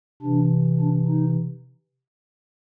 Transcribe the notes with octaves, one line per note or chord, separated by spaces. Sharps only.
C3 E3 D4
D4
D#4